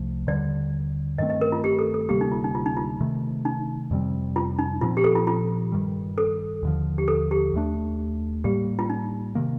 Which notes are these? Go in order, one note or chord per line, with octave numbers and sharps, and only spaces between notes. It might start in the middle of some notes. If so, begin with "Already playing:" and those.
Already playing: C2 C3 F3 A3
D#2 D3 G3 D5
G2 D#3 A3 C4 D#5
D#5
A#4
F4
G4
A4
A4
D2 C3 G3 A#3 G4
D#4
F4
D#4
F4
D#4
F4
C3 D#3 A3
D#4
F2 C3 G3 C4
F4
D#4
A#2 F3 C4 F4
G4
A4
F4
F4
G2 D#3 G3
A4
D#2 D3 F3
G4
A4
G4
D#2 D#3 A3 D4
A2 G3 A#3 G4
F4
D#4
C3 D#3 A#3